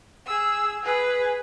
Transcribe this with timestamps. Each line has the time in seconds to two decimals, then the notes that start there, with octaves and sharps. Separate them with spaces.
0.26 G#4 E6
0.83 G#4 B4